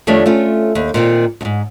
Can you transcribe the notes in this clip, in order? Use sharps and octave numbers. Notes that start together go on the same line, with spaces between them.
F2 D#3 G3 A3 D4 C#5
A3 C#4 F4
D#2
A#2 D#3 C4
D2 G#2